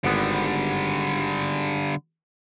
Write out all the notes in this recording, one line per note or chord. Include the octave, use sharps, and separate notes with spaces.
G#1 D3 G3 B3